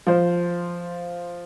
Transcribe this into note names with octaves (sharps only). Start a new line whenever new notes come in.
F3 C5